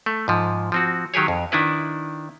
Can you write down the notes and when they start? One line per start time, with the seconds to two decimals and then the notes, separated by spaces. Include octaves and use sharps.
0.06 A3
0.28 G#2 F3
0.72 F3 C4 F#4
1.14 D#3 F#3 G4 G#4 C#5
1.28 F2
1.52 D#3 D4 E4 B4